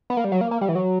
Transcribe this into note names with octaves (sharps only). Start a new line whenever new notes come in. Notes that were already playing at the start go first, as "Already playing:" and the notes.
B3
A#3
G3
F#3
A#3
A#3
G3
E3
F#3